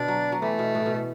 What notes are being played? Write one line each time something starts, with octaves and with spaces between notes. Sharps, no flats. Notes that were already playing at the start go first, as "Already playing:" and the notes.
Already playing: B2 D3 D4
F#3
F#3
E3 A3
B2
A2
B2